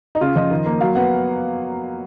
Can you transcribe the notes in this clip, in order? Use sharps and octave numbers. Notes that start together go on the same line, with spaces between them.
D#4
C#3 F4
F3 D#5
D#3
A#3
F#3 F5
B3 F#5